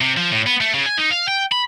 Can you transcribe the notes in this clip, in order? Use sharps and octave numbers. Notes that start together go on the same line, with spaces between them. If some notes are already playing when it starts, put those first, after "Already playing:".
C3
F3
A2
B3
A3
C#3
G#5
D#4
F5
G5
B5